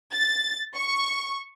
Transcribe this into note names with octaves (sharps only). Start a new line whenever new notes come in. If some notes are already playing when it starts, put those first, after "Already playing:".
A6
C#6